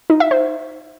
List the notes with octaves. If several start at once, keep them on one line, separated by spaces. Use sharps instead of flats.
D#4
E5
C5